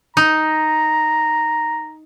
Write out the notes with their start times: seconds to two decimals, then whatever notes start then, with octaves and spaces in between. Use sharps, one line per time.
0.17 D#4 A#5